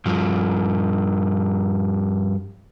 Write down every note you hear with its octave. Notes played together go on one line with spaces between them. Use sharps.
G2 F3